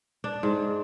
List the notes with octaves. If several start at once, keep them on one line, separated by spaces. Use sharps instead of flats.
D4
G#2